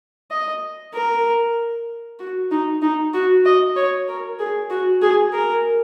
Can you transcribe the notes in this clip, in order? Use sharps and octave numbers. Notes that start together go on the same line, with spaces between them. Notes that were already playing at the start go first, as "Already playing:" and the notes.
D#5
A#4
F#4
D#4
D#4
F#4
D#5
C#5
A#4
G#4
F#4
G#4
A#4